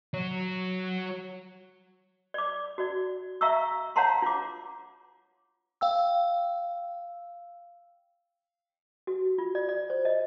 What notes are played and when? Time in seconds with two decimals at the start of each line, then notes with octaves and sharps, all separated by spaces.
0.14 F#3 C#5
2.34 D5 D6
2.78 F#4 D5
3.41 E5 F5 A#5 C#6 E6
3.96 C#5 F5 F#5 A5 A#5 C6
4.22 F4 D6
5.81 F5 G5 E6
9.07 F#4
9.38 F4
9.55 D5
9.69 D5
9.90 C5
10.05 D#5